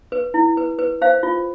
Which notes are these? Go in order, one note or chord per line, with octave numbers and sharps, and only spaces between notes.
B4
E4
B4
B4
C5 F5
F4